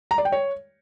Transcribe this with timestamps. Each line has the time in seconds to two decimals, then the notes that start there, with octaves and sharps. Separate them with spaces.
0.11 A#5
0.18 D5
0.25 G5
0.32 C#5